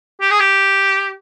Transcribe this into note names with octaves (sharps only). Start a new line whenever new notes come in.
G4
G#4
G4